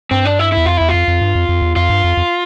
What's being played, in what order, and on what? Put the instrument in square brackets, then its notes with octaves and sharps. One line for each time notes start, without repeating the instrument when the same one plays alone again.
[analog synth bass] G2 [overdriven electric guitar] C4
[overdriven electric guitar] D4
E4
[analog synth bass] E2 [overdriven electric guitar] E4
[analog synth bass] F2 [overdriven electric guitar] F4
[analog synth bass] E2 [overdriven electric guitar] E4
[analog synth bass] F2 [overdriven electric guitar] F4
[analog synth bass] F2
G2
F2
F2
E2
[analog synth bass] F2 [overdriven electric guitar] F4
[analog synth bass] G2
F2
F2